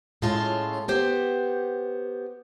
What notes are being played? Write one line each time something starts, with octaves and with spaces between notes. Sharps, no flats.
A2 G#3 A3 C#4 F4 A5
B3 G4 C5